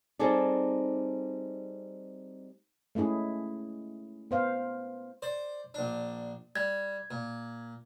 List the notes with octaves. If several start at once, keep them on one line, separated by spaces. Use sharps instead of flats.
G3 C4 D#4 G#4 A4 D5
G#3 A3 C#4 E4 G#4
B3 C5 F5
C5 D5
A#1 D4
G3 G#6
A#2